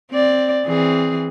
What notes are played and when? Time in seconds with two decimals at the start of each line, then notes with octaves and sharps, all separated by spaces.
0.11 C4 D5
0.65 E3 C4 G#4